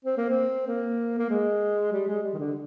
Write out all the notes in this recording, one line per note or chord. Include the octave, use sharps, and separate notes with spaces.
C4
A#3
C4
A#3
A#3
G#3
G3
G#3
G3
D#3
D3